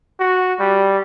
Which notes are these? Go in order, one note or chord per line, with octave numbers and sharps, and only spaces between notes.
F#4
G3